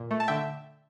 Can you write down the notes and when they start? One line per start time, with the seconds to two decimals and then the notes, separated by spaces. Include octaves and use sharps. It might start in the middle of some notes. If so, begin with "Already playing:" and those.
Already playing: A#2
0.11 A3
0.20 A5
0.28 D3 E5 G5